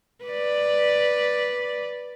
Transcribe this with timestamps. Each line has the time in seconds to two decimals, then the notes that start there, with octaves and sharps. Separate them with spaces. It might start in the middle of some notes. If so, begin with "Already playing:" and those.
0.25 B4 D5